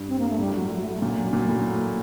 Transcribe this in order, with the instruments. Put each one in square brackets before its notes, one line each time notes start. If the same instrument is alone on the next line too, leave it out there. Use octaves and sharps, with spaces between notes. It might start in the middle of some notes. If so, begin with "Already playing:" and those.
Already playing: [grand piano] G2
[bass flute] C4
A#3
A3
[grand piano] A2 [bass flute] G3
[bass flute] F#3
F#3
A3
A3
[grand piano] A#2 [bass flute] F#3
[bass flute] F#3
[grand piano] A#2 [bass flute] F#3
[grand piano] A2